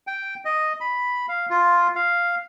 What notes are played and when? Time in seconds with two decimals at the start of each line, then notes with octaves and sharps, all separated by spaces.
0.07 G5
0.45 D#5
0.80 B5
1.29 F5
1.50 F4
1.96 F5